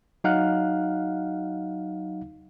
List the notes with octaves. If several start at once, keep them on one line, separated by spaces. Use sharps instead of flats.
F#3 D#4 F5 F#5 F6 F#6